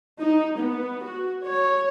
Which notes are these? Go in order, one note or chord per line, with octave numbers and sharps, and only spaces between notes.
D#4
B3
F#4
C#5